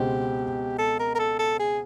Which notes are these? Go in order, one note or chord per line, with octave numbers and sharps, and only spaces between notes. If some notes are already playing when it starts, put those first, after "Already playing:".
Already playing: C#2 B2 G#3 C4 G4
A4
A#4
A#4
A4
A4
G#4